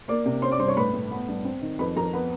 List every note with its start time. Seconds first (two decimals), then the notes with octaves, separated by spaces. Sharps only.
0.08 A#3 D5 D6
0.26 C3
0.42 C#4 C5 C6
0.51 D5 D6
0.59 G2 C5 C6
0.68 C#5 C#6
0.77 A2 B4 B5
0.94 A2
1.11 B3
1.28 G2
1.45 C4
1.62 D#3
1.79 F2 B4 B5
1.96 F2 A#4 A#5
2.13 B3 B4 B5